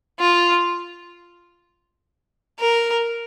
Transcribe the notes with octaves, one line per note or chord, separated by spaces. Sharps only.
F4
A#4